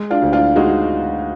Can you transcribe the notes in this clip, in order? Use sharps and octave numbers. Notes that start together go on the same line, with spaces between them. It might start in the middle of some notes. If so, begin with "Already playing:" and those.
Already playing: G#3
D4 F4
D2
D4 F4
G#3 D#4 F#4